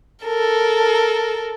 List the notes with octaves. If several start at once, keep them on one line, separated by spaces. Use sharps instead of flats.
A4 A#4